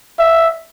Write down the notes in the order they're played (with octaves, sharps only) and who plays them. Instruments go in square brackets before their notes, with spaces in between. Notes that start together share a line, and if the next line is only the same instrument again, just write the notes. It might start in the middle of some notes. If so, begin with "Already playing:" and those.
[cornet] E5